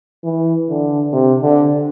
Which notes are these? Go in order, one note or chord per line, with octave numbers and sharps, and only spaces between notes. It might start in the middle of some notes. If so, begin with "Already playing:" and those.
E3
D3
C3
D3